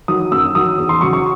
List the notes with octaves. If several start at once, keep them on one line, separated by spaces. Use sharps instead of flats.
D#3 F#3 D#6
F#2 E6
D#3 F#3 D#6
E2
C6
C#3 F#3 C#6
C#6